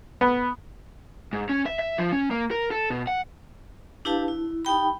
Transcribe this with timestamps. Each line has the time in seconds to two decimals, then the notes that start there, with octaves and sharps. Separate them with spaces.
0.21 B3
1.33 G#2
1.49 C#4
1.66 E5
1.79 E5
1.98 F3
2.12 C#4
2.31 A#3
2.51 A#4
2.71 A4
2.90 B2
3.07 F#5
4.05 D4 E4 G4 B4 F5 A5
4.28 E4
4.65 D#4 G4 G5 B5